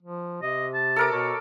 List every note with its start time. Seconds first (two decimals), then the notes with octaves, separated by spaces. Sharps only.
0.03 F3
0.42 C3 D#5
0.74 A5
0.96 A4 A#4 D6
1.13 B2 C#5